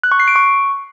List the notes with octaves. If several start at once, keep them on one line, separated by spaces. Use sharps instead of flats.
F#6
C#6
C7
D7
C#6